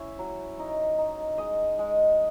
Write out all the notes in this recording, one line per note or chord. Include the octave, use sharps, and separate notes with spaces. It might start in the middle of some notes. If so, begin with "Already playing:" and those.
Already playing: C#4 E4 C#5 E5
F#3
D#4
D#4
G#3 D#5
G#3